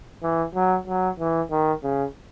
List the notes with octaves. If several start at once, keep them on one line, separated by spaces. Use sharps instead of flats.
E3
F#3
F#3
E3
D#3
C#3